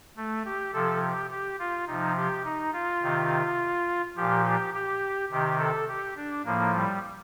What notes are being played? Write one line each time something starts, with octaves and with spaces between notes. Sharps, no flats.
A3
G4
C3 F3 A4
G4
G4
F4
C3 F3 D#4
G4
D#4
F4
C3 D#3
A#2 F3 G4
G4
G4
C3 D#3 G4
A4
G4
D4
A2 F3 A#3
G3